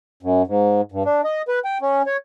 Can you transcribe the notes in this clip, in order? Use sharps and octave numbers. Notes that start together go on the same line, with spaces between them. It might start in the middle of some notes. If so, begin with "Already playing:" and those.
F#2
G#2
G2
D4
D#5
B4
G5
C#4
C#5